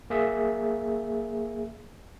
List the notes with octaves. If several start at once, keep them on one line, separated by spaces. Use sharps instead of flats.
A#3 G#4 E5